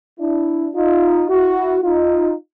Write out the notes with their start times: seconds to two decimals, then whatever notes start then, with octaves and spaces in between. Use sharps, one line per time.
0.19 D4 E4
0.75 D#4 F4
1.29 E4 F#4
1.84 D#4 F4